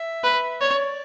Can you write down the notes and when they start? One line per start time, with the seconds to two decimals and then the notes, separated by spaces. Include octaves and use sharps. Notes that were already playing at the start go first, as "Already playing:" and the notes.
Already playing: E5
0.24 B4
0.61 C#5 D5